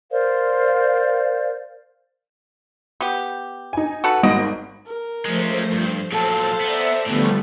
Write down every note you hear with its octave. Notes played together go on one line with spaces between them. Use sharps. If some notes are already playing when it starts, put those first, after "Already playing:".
A#4 C5 D5 F5
B3 G4
D#4 G#5
F#4 A4 B4
G#1 G#2 F#4 D#5 D7
A#4
F3 G#3 A3 C#4 C5
G2
A#2 F#3 A4 C5 F5 A5
B3 C5 D5 E5 A#5
A2 D3 E3 F3 G3 A3 B3